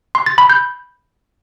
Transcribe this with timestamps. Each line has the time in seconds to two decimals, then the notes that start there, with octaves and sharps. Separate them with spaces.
0.15 C6
0.26 A6
0.38 B5
0.50 G6